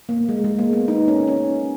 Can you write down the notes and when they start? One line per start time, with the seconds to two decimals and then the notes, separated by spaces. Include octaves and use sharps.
0.09 A#3
0.29 G#3
0.44 G#3
0.59 A#3
0.73 B3
0.88 D#4
1.08 C#4
1.27 C#4